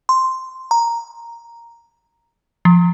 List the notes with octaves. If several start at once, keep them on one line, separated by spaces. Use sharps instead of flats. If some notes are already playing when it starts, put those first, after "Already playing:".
C6
A#5
F3